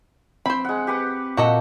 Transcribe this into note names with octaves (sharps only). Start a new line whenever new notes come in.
C4 C5 B5
G#3 F#5
G4 B4 F#5
A#2 F#4 A4 D#5